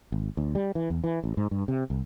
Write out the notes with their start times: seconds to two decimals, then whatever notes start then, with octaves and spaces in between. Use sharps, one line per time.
0.12 G#1
0.37 D2
0.55 G3
0.75 E3
0.90 E2
1.04 E3
1.24 A1
1.37 G#2
1.51 G2
1.68 C3
1.90 C2